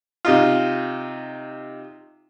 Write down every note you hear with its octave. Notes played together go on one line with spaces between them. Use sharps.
C3 D#4 F4